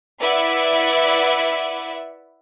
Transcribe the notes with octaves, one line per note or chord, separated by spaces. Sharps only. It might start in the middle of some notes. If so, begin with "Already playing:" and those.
E4 B4 D5 E5 F#5